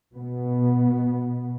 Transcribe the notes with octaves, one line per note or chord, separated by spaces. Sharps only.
B2 B3